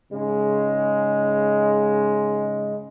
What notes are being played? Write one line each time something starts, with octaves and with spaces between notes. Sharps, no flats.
G#2 C#3 G#3